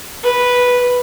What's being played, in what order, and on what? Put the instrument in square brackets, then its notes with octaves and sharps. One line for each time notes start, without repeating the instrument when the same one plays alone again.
[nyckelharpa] B4